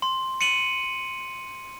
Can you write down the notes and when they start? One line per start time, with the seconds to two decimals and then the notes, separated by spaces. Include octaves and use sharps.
0.02 C6
0.41 C#7 D#7 F#7